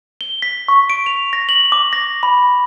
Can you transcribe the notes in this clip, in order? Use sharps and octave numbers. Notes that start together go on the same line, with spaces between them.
G7
B6
C#6
D7
F7
A#6
F#7
D6
A#6
B5